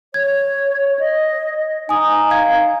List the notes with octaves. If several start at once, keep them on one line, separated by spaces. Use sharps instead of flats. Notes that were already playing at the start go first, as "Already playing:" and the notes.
C#5 G#6
D#5
D#4 G#5 D#6
F5 G#6